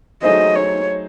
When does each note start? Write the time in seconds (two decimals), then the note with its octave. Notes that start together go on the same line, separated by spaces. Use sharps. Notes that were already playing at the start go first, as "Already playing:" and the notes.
0.23 F#3 A3 D#4 G#4 C5 D#5
0.56 C#5